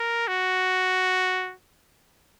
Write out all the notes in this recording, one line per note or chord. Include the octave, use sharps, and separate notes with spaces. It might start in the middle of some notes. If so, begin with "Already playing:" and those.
Already playing: A#4
F#4